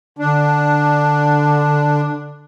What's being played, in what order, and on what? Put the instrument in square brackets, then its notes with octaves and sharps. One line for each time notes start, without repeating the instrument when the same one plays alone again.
[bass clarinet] D3 [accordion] D4